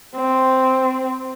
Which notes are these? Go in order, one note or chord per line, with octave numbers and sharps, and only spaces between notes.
C4